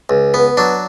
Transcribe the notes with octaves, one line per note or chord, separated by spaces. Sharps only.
C#2
B3
F#3 D4